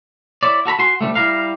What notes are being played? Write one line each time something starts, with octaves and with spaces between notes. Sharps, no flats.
E4 C#5 D5
F#4 A4 A#5 B5
F#4 G#5 C6
D2 F3 G3 A3
G3 E4 A#4 F5